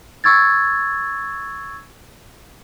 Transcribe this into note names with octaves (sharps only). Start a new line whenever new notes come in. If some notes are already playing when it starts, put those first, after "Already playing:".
C#6 E6 G#6 A6